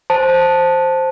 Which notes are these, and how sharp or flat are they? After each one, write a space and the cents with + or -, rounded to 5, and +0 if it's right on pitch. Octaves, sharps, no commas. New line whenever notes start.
C5 +0 A5 +0